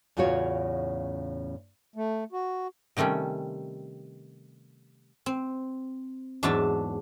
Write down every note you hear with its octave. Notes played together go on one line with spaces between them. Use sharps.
E2 A2 C#3 F4 F#4 C#5
A3
F#4
C3 D#3 G3 A3 C#4
C4
E2 G#2 F#3 D4 E5 A5